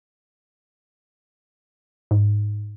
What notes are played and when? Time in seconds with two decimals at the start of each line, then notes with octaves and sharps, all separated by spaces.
2.11 G#2